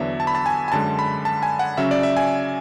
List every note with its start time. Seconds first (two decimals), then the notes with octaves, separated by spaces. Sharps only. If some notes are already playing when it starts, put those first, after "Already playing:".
Already playing: E2 D3 F#3 B3 D4 E5
0.20 A5
0.27 B5
0.35 A5
0.46 G#5
0.68 G#5
0.72 F#2 D3 G#3 A5
0.99 B5
1.25 A5
1.43 G#5
1.59 F#5
1.77 C#3 F#3 C#4 E5
1.91 D5
2.03 E5
2.17 G#5